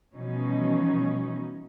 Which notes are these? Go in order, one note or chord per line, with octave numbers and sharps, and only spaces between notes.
B2 E3 F3 G3 C#4 D#4